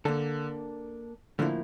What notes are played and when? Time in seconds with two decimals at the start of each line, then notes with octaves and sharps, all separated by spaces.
0.05 D3 A#3 D4 A4
1.39 A2 D3 F3 A#3 E4